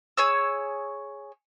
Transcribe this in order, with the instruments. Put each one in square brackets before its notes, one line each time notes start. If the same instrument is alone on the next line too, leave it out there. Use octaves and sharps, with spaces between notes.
[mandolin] G#4 C#5 E6